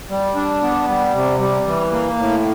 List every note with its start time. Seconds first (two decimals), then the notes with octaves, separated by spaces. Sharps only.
0.10 G3
0.35 D4
0.62 B3
0.88 G3
1.15 C3
1.40 G3
1.66 E3
1.93 A#3
2.18 A2